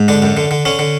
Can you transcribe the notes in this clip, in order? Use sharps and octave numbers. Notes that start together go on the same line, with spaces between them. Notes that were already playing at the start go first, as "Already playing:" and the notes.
Already playing: G#2
D3 D4
F#2
D3
D3
D3 C#4
D3